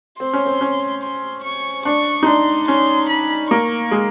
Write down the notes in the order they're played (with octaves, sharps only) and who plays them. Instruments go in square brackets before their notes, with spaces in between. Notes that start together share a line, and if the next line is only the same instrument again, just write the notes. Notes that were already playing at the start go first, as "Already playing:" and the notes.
[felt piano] C4 [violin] C6
[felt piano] C#4
C4
C#4
[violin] C6
C#6
[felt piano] D4 [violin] C#6
[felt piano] D#4
[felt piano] D4 [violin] C6
[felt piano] C#4 [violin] C6
[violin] B5
[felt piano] A#3 [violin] C#6
[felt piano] G#3